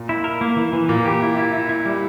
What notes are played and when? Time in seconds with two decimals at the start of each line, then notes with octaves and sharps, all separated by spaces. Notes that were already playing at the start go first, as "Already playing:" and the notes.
Already playing: A#2
0.09 E4
0.24 A#4
0.41 A#3
0.56 E3
0.73 E3
0.89 A#2 A#3
1.05 G4
1.22 E4
1.37 E4
1.54 E4
1.69 E4
1.85 G3